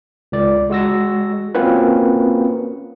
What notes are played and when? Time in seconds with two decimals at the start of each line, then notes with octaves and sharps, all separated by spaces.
0.32 C#2 D5
0.70 G#3 F#4 E6 A#6
1.55 A#3 C4 C#4 F4 F#4 B4